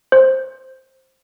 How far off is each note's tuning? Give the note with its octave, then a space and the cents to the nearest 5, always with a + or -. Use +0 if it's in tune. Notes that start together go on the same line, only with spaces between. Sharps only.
C5 +10